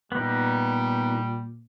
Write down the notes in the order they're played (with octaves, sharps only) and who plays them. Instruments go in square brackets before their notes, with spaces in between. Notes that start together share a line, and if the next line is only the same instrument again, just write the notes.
[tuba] A#2 [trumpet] G3 [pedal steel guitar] B3 D#4